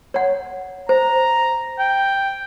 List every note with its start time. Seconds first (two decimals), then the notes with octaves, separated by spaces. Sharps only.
0.14 C#5 F#5
0.89 C5 A#5
1.79 G5